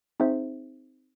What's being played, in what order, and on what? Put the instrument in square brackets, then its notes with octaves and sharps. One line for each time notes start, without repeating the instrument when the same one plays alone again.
[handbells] C4 D#4 G#4 C5 E5